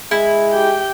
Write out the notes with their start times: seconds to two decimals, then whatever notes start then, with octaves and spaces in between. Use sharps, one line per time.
0.11 G#3 E4
0.53 G4 G5